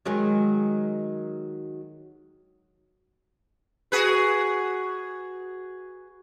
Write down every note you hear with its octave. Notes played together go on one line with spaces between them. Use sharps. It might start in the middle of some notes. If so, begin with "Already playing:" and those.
D#3 F#3 G#3
F#4 G#4 B4